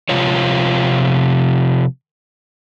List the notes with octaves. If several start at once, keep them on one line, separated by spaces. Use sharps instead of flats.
C3 F3 F4 C#5